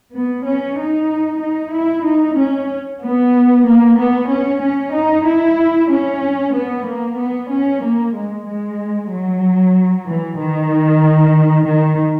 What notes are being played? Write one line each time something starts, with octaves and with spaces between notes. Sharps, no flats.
B3
C#4
D#4
D#4
E4
D#4
C#4
B3
A#3
B3
C#4
C#4
D#4
E4
C#4
B3
A#3
B3
C#4
A#3
G#3
G#3
F#3
E3
D#3
D#3